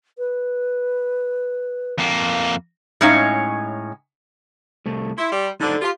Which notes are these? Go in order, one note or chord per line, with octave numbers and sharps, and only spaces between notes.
B4
F2 A#3
A2 G#3 C#4 D#4 C#5 F5
C2 A3
E4 C6
G3
D3 D#4 A4 C5
F4 G4